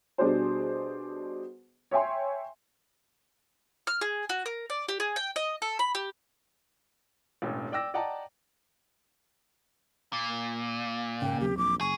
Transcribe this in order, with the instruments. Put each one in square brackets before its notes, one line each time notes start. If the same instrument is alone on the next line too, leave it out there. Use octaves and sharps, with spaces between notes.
[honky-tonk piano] B2 G3 D4 G#4 C5
C#5 E5 G5 G#5 C6
[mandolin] F6
G#4
F#4
A#4
D5
G4
G#4
G5
D#5
A4
B5
G4
[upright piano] E1 A1
D5 G5 D6 E6 A#6
D5 D#5 F#5 G5 A5 A#5
[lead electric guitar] A#2
[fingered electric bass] G#2 [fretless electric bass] C#3 A#3 [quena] G5
[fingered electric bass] D#2 F#3 C4 [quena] G4
[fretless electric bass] A#1 [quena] D6
[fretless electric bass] F#1 [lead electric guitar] G#4 [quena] C#6